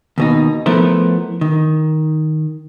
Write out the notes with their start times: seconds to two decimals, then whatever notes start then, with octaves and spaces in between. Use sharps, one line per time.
0.18 D#2 B2 D#4
0.66 F3 A3 B3 E4 A#4
1.41 D#3